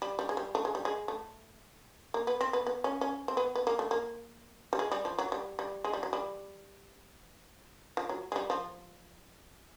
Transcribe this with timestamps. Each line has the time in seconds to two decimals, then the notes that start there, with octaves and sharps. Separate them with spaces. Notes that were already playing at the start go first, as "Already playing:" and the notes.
0.02 G3
0.19 G3
0.29 G#3
0.37 G3
0.55 A3
0.65 G#3
0.75 G3
0.85 G#3
1.08 A3
2.14 A#3
2.27 B3
2.41 C4
2.53 B3
2.67 B3
2.84 C#4
3.01 C#4
3.28 C4
3.37 B3
3.55 B3
3.67 A#3
3.79 A3
3.91 A#3
4.73 G3
4.79 G#3
4.92 G3
5.05 F3
5.19 F#3
5.32 G3
5.59 G3
5.84 G#3
5.93 G3
6.03 F#3
6.13 G3
7.97 F3
8.09 F#3
8.32 G#3
8.36 G3
8.50 F3